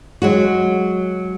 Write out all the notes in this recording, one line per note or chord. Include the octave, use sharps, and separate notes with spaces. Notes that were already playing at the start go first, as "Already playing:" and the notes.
F#3 G#3 F#4